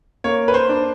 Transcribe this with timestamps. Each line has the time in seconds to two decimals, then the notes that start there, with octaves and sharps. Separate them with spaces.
0.24 A#3 C#5
0.48 B4
0.54 C5
0.69 D4